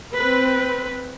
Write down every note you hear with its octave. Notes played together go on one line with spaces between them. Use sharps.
C4 B4